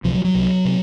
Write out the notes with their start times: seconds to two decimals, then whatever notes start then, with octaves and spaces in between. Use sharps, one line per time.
0.04 C2 C3 F3
0.14 F#3
0.24 F#3
0.35 C2 C3
0.65 C3